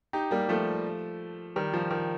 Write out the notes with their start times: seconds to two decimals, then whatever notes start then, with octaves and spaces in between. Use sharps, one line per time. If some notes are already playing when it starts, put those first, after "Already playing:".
0.13 D#4 G4
0.31 G3 A#3
0.49 F3 A3
1.56 D#3 G3
1.73 F3
1.91 D#3